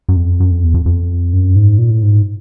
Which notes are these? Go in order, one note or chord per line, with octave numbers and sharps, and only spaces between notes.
F#2
F2
F#2
F2
E2
F2
F2
F#2
G#2
A#2
A2
G#2